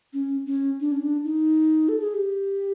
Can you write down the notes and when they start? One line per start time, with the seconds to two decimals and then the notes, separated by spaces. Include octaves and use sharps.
0.13 C#4
0.46 C#4
0.81 D4
0.92 C#4
1.02 D4
1.25 D#4
1.89 A4
2.01 G#4
2.14 G4